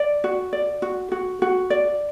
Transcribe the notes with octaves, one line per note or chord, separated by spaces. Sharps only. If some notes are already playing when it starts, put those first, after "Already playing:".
Already playing: D5
F#4
D5
F#4
F#4
F#4
D5